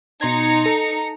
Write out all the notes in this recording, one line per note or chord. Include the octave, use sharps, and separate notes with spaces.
B2 D#4 A#5 C6 G#6 C#7
A4